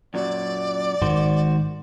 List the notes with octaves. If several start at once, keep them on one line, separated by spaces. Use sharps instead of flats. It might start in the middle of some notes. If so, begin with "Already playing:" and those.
F#2 A#2 F#3 D5
G#1 G#2 D#3 F#4 C5